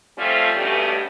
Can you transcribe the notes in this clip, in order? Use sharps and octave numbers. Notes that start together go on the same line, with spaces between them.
F3 G3 A3 C4 C#4 F4
G2 B2 A3 C#4 G4